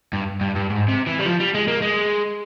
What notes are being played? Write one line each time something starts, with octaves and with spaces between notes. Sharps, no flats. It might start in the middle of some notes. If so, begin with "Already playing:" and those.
G2
G2
G2
G#2
C3
E3
G3
F3
G3
G#3
A#3
G#3